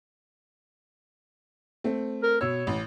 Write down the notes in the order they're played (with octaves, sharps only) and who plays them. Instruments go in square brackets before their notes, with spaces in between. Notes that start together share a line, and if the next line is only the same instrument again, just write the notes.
[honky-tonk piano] A3 C4
[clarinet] A#4
[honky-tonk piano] B2 E6 [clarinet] C#5
[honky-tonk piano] A1